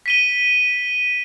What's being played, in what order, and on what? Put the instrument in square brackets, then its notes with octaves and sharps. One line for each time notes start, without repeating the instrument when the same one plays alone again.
[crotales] B6 D#7 G7